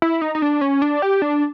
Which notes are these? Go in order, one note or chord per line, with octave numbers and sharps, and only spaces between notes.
E4
D#4
D#4
D4
C#4
D4
G4
D4